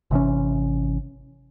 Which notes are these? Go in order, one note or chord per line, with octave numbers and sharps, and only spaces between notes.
G#1 C3 E3 C#4